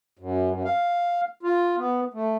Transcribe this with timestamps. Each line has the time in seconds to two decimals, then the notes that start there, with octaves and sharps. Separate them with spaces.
0.19 F#2
0.51 F#2
0.64 F5
1.43 F4
1.77 B3
2.14 A3